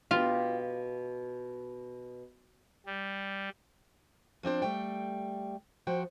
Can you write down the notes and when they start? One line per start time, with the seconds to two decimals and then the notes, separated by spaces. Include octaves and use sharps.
0.11 B2 F4 G4
2.86 G3
4.43 F3 C4 D4 C5
4.62 G3 A3 G5
5.87 F3 F#4 C5 G5